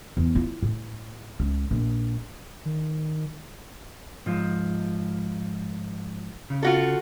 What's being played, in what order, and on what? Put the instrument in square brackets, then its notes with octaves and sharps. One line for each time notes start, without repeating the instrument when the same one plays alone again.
[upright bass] E2
E4 F4
A2
C#2
A#1
[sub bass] D#3
[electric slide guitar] G#2 F3
C#3
[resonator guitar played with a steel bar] F4 F#4 A4